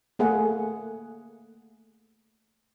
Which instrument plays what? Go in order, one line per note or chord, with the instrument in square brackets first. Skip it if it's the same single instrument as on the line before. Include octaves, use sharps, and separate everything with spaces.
[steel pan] A3 A#3 G#4 A4 E5 F#5